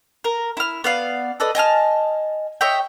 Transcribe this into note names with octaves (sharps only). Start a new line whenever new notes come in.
A#4
E4 F6
B3 D5 F5
A4 B4 D5 D#5
D#5 G#5 A5 F6
C#5 D#5 E5 G5